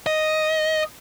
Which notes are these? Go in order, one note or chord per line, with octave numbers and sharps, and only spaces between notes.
D#5